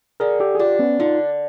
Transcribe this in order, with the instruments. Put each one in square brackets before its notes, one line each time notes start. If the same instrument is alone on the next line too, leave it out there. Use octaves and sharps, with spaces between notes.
[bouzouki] D3 [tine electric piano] G#4 A#4
[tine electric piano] G4 A4
G#4
[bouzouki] D4 [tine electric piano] F4 G4
[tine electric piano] B3 C#4
[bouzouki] D3 [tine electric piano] D#4 F4